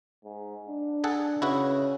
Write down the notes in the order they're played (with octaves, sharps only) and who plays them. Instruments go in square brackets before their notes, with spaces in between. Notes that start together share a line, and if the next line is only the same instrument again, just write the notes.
[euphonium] G#2
D4
[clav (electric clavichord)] G#4 A4 F#5
[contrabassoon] C#3 [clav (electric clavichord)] E4 F#4 B4